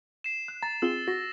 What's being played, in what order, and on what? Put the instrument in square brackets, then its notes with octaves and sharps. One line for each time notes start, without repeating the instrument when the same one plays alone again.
[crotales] C7 E7
[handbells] F#6
[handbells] A#5 [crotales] A6
[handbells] C4 F4 G#4 [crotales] E6 G7
[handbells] F#4 [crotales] A#6